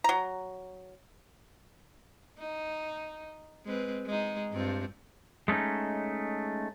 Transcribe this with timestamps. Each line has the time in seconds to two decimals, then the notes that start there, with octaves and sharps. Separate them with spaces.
0.04 F#3 A#5
2.39 D#4
3.65 G#3 C4 B4
4.05 G#3 D#4
4.52 G2 C4 F4
5.48 G#3 A3 C4 C#4 D#4